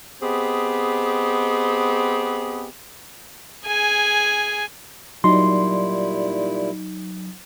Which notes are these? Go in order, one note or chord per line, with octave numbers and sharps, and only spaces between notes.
B3 C4 G4 G#4 D#5
G#4 G#5
A#2 F#3 G3 D#4 E4 C6